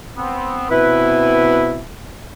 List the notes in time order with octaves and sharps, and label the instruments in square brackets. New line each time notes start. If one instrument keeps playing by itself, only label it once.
[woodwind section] B3 C4
[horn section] B2 C4 E4 [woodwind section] B4